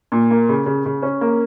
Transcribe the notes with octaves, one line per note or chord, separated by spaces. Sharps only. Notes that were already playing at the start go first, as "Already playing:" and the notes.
A#2
A#3
C#3
C#3
C#3
C#4
A#3